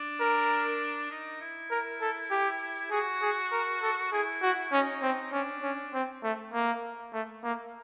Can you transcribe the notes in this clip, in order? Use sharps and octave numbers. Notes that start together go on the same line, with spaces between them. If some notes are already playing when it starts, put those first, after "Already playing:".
Already playing: D4
A#4
D#4
E4
A#4
A4
G4
F#4 G#4
G#4
A#4
A4
E4 G#4
F#4
C#4 D#4
C4
C#4 D4
C#4
C4
A3
A#3
A3
A#3